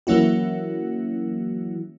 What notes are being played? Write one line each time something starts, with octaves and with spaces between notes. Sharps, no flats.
E3 F#3 A#3 C#4 E4 F#4